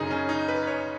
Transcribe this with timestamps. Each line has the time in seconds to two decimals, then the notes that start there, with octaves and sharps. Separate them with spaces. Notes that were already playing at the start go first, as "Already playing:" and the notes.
Already playing: F#2 C#3 D#4 G#4
0.10 C#4
0.29 D#4
0.48 B4
0.67 C#5